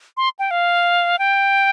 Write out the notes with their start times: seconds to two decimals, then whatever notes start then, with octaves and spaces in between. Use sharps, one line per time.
0.17 C6
0.39 G5
0.51 F5
1.19 G5